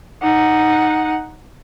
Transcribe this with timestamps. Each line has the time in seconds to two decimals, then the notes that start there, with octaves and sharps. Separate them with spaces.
0.22 D#4 F#5